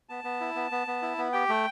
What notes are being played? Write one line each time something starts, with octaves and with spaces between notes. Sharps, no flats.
B3 A5
B3
E4
B3
B3
B3
E4
B3
G4 G5
A3